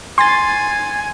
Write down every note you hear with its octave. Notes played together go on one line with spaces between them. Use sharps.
G#5 C6 A6